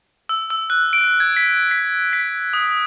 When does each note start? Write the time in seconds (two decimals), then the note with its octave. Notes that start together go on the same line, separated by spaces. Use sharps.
0.29 E6
0.50 E6
0.70 F#6
0.93 D7
1.20 G#6
1.37 B6
1.71 B6
2.13 B6
2.53 D#6